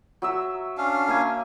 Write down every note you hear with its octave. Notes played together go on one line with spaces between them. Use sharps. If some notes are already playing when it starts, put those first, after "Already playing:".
F#3 E5 E6
C#4 D4 F5
A#3 E5 G#5